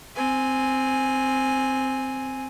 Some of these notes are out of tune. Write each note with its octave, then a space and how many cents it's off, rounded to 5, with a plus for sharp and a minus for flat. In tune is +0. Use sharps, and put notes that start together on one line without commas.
C4 +0 G#5 +0